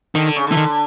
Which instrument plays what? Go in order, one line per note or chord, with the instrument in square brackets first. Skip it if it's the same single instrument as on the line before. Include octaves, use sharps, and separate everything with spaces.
[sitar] D3 [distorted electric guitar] D#3
[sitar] D3
C#3
D3
[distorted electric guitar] E3
D#3